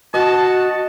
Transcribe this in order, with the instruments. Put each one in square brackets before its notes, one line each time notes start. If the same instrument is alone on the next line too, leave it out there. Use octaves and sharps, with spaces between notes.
[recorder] F#4 [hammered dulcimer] D#5 [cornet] A5